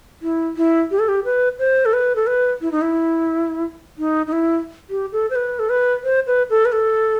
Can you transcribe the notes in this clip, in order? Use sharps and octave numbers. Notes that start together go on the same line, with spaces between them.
E4
E4
G4
A4
G4
B4
C5
A4
B4
A4
B4
E4
D#4
E4
D#4
D#4
E4
G4
A4
C5
B4
A4
B4
C5
B4
A4
B4
A4